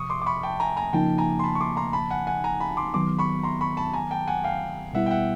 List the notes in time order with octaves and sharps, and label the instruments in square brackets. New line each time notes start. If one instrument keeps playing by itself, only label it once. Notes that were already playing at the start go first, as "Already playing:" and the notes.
Already playing: [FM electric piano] C3 F3 [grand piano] C#6 D#6
[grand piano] C6 D6
D6
B5 C#6
G5 A5
G#5 A#5
G#5 A#5
[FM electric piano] C#3 F3 A#3 D#4 [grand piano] G5 A5
[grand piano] G#5 A#5
C6
A5 B5
C#6
C6 D6
A#5 C6
A5 B5
F#5 G#5
F#5 G#5
G#5 A#5
A5 B5
C6 D6
[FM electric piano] D#3 F#3 B3 [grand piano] C6 D6
[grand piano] B5 C#6
A#5 C6
B5 C#6
A5 B5
G#5 A#5
G5 A5
F#5 G#5
F5 G5
[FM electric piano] B2 G3 B3 E4 [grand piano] E5 F#5
[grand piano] G5
E5 F#5